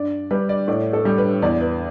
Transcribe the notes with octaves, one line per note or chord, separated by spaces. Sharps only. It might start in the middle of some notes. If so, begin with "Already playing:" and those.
Already playing: G2 D5
G3 B4
D5
A2 D5
A4
G3
B4
E2 D5
B4